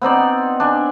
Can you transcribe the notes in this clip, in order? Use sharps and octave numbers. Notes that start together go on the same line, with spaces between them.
B3 C4 D#4 D5
D4 G#5